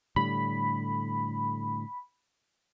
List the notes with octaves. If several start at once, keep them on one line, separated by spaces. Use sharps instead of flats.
A2 D3 G3 B5